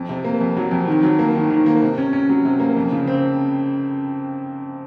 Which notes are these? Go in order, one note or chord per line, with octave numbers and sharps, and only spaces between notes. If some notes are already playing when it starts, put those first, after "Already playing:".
Already playing: F2
C3
A#3
F2
F#3
F2
D#3
F#3
A#3
D#3
D#3
A#3
C3
C#4
C#4
F#3
C3
A#3
F2
C#3
C4